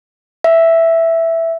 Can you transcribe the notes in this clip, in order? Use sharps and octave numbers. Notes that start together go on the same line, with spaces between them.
E5